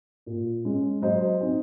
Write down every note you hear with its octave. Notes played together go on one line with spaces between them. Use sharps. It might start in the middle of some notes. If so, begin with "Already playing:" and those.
A#2
G#3 C#4
F#3 C5 D#5
C4 D#4